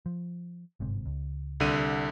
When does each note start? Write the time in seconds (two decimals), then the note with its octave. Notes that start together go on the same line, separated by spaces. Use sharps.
0.06 F3
0.80 G1 G#2 C3
1.06 C#2
1.60 C2 D3 D#7